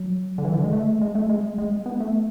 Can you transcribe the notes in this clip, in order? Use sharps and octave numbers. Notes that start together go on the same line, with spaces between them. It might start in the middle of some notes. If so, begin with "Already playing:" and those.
Already playing: F#3
D3
E3
D3
G#3
A3
G#3
A3
G#3
G#3
B3
A3